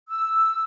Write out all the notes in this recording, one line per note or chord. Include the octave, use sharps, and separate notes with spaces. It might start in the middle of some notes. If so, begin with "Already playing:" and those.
E6